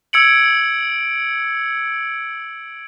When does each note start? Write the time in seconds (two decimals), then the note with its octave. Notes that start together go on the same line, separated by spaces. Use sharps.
0.13 E6 G#6 C#7 D7 F#7